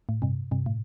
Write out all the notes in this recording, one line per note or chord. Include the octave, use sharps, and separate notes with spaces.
A2
G2 C3
G2 C3
A2